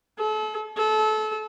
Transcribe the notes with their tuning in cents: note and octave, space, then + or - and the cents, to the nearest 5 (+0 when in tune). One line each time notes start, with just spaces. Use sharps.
A4 -35
A4 -30